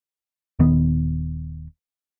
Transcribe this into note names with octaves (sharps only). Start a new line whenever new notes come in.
D#1 D#3 B3